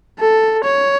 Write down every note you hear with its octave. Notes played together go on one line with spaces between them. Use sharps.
A4
C#5